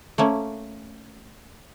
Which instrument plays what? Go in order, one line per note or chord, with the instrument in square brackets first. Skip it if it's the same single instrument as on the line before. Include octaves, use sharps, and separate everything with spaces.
[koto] A3 A#3 C#4